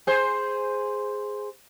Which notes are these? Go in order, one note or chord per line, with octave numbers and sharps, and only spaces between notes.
G#4 C5